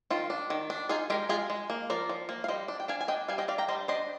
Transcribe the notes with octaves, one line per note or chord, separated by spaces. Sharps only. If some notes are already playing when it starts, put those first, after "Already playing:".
D#3 F4
D4
D#3
D4
D#4 F4 G#4
G#3 G4 A#4
G#3 F4 G#4
G#3
A#3
F3 A#4 D5
F3
A#3
F5
G3 C5 D#5
D4
G5
D4 F5 G#5
G#5
D4 D#5 G5
G3 F5 G#5
D#5 G5
D4 D5 F5
G5 A#5
G3 C5 D#5
D4 C5 D#5